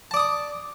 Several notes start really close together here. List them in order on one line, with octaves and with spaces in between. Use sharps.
A5 D5 D#6 D6